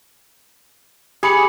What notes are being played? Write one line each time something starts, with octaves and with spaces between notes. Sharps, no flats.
G4 G#4 B5 C#7